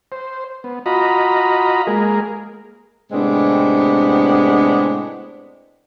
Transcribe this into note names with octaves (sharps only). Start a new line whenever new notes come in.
C5
B3
F4 F#4 D#5 A#5 B5
G#3 A#3 G#4 A#4
A2 C3 G#3 B3 C4 D4